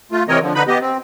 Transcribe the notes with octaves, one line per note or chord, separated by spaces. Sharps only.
A3 F4
C3 E3 C4 A#4 C#5 D#5
D3 F3
D3 D#4 B4 B5
B3 G4 D#5
C4